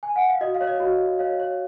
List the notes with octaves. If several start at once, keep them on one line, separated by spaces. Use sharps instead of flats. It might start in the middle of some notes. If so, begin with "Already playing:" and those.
G#5
F#5
F5
F#4 D#5
F5
C#5
D#5
F#4
F#4
C#5 F5
C#5